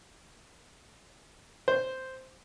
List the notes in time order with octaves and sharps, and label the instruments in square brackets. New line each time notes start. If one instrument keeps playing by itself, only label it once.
[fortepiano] C5